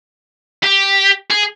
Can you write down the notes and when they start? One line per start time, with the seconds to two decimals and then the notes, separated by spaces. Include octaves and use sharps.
0.63 G4
1.31 G#4